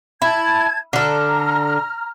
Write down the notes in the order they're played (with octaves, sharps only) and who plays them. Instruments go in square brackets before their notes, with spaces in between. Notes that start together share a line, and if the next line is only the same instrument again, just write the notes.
[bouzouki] E4 [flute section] A5 G#6
[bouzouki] D3 A4 [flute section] A#5 F6